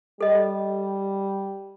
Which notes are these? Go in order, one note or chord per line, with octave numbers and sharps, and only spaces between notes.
G3 A4 D#5